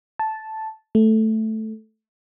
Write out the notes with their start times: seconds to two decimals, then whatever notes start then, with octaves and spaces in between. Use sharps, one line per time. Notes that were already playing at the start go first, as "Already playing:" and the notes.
0.19 A5
0.95 A3